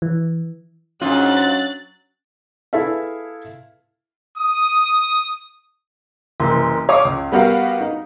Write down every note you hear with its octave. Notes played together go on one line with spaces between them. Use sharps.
E3
G#2 F#3 C#4 D4 F4 F#6 A6
E4 G#4 A4 B4 E5 F5
D#6
F#1 C2 E3 C6
C#5 F5 D6 D#6
C#2
G3 B3 F#4 G4 A#4 F5
D#4